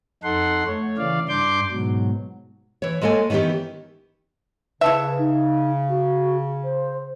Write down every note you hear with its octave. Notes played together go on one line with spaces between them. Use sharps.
F2 D#4 A4 F#5 C6
A3 C#5
C#3 E3 D5 F5
G2 D4 C6 D6 G6
G#2 B2 F#3
E3 C#5
G#3 A#3 A4 C#5 G#5
D#3 E3 B3 C#4 G4
C#3 E4 A4 B4 E5
D#4
F#4
C5